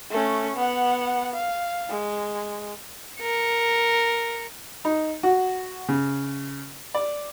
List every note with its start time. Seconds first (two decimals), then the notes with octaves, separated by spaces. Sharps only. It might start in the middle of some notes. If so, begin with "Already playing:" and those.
0.11 A3 C#4
0.56 B3 F#5
1.33 F5
1.90 G#3
3.21 A#4 C#7
4.85 D#4
5.23 F#4
5.88 C#3
6.95 D5